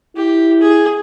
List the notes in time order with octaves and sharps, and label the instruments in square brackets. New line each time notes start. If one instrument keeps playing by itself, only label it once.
[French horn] E4 [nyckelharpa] G4
[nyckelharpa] G#4